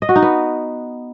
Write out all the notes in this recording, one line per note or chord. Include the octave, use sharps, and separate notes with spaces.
D#5
F#4
D#4
B3